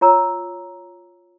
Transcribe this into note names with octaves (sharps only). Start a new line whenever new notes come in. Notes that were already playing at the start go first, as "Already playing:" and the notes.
F4 C#5 A#5 E6